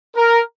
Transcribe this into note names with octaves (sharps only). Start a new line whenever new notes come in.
A#4